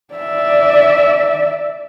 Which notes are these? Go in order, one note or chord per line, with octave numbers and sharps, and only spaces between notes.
D5 E5